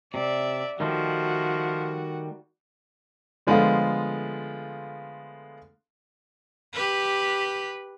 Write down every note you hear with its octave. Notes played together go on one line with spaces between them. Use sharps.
C3 D5 E5
D#3 F3 G3 A3 F#4
D3 F3 G#3 A3 B3 F4
G4 B4